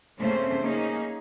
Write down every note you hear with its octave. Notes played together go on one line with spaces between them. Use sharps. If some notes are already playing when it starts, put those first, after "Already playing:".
C#3 A3 A#3 C4 C#4 C5
A#3 C#4 D#4 G#4